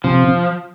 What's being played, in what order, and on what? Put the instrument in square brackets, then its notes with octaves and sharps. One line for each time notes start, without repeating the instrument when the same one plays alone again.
[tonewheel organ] C3 [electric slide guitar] F3